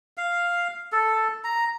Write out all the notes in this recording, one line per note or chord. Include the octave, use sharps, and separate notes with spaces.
F5
A4
A#5